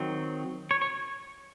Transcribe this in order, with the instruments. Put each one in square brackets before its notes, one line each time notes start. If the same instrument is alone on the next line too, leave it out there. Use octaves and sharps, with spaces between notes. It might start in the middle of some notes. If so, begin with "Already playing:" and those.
Already playing: [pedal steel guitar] D#3 F#3 C4
C#5
C#5